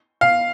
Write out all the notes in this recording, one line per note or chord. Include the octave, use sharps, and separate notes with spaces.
F5